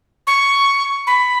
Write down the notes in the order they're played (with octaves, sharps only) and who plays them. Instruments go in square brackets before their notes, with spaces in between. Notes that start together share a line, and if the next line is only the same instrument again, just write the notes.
[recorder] C#6
B5